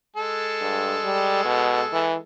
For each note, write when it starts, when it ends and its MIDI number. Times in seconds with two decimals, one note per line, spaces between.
0.16 2.23 56
0.16 2.23 69
0.62 0.96 43
1.04 1.41 55
1.45 1.81 47
1.93 2.15 52